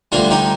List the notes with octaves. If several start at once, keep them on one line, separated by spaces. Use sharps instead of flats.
D2 D3 G3 D4 F4
D#4 G4